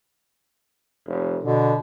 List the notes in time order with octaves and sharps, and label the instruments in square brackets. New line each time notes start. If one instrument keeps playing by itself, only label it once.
[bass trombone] F1
[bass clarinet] B2 [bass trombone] D3